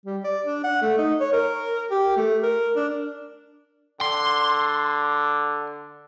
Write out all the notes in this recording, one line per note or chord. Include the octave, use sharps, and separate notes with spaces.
G3
D5
D4
F#5
A3
D#4
C#5
A#4
G4
A3
A#4
D4
D3 C6